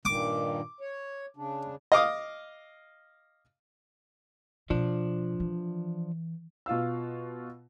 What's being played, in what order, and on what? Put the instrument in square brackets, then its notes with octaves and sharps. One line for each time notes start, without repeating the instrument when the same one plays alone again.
[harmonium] G2 A#2 D#3 [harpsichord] D6
[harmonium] C#5
C#3 D4
[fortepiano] D#5 F5 D6 D#6
[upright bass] B2 [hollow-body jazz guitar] F3 D4
[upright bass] E3
[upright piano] B2 F4 F5 E6